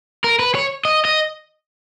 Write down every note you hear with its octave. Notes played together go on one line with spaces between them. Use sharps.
A#4
B4
C#5
D#5
D#5